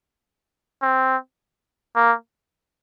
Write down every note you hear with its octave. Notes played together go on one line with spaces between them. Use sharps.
C4
A#3